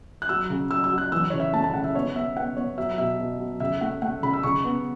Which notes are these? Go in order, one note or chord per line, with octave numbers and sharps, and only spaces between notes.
F#6
F#3 E6
C#3
F#3 E6
E6
F#3
F#6
E3 E6
C#3 C#5
E5
A3 A5
A5
C#3 F#5
E5
B3 C#5
B3 E5
B3 F#5
B3 C#5
F#3 E5
B2 E5
B2
F#3
C#3 E5
A3 F#5
A3 F#5
C#3 B5
E6
C#3 C#6
B3